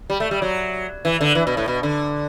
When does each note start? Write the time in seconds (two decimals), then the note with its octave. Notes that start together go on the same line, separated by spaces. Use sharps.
0.10 G3
0.20 A3
0.31 G3
0.42 F#3
1.05 E3
1.21 D3
1.35 E3
1.47 B2
1.57 A2
1.68 B2
1.83 D3